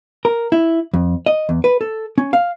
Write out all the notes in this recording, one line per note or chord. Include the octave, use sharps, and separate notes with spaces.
A#4
E4
F2
D#5
E2
B4
A4
C#4
F5